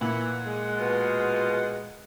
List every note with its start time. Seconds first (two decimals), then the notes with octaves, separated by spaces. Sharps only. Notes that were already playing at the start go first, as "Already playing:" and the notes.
0.01 A#2 E3 F#5
0.46 G#3
0.78 B2 F4